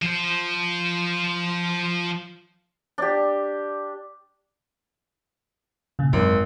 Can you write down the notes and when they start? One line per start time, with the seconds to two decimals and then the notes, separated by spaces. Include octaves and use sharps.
0.02 F3 C5
2.98 D4 G4
5.99 A#2 C#3
6.13 G#1 F#2